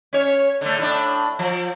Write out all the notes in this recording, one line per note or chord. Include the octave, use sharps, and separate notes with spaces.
C#4 C#5
D3 A3
A2 D4
F3